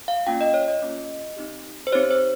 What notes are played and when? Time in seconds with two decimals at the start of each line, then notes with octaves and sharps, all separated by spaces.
0.08 F5
0.27 A#3 C#4 F4 G5
0.41 D#5
0.54 C#5
0.68 D#5
0.82 A#3 C#4 F4
1.37 C4 D#4 G4
1.87 C5
1.92 C4 D#4 G4 C#5
2.11 C5